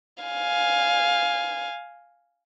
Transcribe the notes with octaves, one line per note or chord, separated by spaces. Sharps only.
F5 G#5